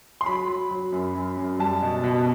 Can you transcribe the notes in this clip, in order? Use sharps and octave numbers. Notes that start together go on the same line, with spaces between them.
C6
F#3 B5
F#3
F#3
F#2
F#2
F#2
G3 A5
B2
B2